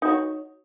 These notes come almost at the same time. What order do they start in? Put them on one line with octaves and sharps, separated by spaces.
D#4 F#4 C#5